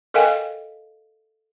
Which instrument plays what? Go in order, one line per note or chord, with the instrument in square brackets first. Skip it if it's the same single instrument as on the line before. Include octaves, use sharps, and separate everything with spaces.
[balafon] A4 A#4 D#5 F5 G5 G#5